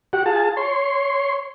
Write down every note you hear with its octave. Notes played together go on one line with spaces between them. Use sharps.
F#4 G4 F#5
F4 G#4 A5
C#5 C6